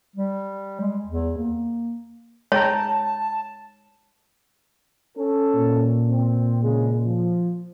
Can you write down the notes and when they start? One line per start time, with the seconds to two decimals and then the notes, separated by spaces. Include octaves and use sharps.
0.16 G3
0.81 G#3
1.06 E2
1.38 A#3
2.52 G#3 C#5 G5 A5 A#5
5.18 C#4 A4
5.55 A#2
6.09 C4
6.63 C#3 G#3
7.06 F3